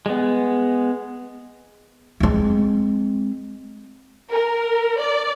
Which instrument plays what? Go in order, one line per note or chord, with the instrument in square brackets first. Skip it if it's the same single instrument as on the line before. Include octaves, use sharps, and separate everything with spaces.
[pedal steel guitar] G#3 B3
[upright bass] G#3 C4
[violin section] A#4
D5